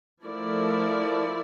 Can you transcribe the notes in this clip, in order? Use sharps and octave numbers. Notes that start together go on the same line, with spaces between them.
F3 A3 E4 A#4 D5